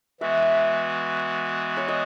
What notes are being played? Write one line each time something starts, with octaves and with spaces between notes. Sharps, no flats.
E3 G#3 B3 F#4 E5
C#5
D#5